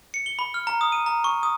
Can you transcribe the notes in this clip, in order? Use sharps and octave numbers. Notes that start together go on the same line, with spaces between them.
C#7
G7
B5
F6
A#5
D#6
D#7
A#5
C#6
D#6